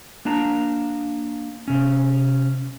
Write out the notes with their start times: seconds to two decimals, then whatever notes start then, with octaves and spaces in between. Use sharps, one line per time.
0.25 A#3 D4 A5 A#5
1.68 C3 C#4